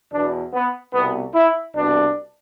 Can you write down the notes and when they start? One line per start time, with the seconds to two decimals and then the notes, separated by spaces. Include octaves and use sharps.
0.12 E2 B2 D4
0.53 B3
0.94 C2 B2 B3
1.34 E4
1.75 C2 B2 D4